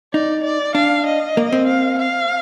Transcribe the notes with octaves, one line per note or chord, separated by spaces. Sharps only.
D#4 D5
D5
D4 F5
D#5
A#3
C4
F5
F5